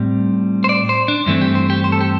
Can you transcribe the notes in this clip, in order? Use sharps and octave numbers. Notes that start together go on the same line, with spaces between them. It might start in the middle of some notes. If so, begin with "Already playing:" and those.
Already playing: A2 G3 C4
C5
D5
C5
D4
G2 E3 A3 C4 E4
G4
C5
G4
C5
A4
G4